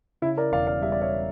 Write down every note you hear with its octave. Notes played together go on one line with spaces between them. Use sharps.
C#3 E4
A#4 D5
E1 D5 F5
D5 F5
G3 E5
D5
C#5 E5